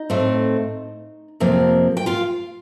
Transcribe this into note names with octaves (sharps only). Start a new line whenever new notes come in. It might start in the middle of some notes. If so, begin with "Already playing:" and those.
Already playing: D#4 D#5
A2 A3 C4
F2 C3 F3 A#3
G5
F4 F5